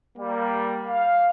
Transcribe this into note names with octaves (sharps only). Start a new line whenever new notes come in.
G3 A#3
F5